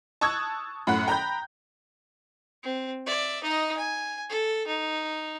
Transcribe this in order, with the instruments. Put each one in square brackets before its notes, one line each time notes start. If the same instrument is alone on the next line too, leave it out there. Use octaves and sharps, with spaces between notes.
[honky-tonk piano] A5 C#6 D#6 E6 F#6 G#6
F#2 A2 F#5 B5 F#6
G5 A#5 B5 G6
[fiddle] C4
D5 E5
D#4 D#5
G#5
A4
D#4